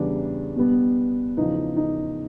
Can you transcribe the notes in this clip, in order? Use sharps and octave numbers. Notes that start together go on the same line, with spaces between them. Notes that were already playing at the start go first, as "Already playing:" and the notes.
Already playing: E2 C#3 E3 G3 D4
B2 G3 B3
E2 C#3 F3 D#4
D#4